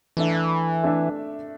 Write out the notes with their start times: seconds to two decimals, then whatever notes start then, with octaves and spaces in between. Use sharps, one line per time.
0.17 E3 A3 D4 A4 E5
0.83 A3 D4 A4 E5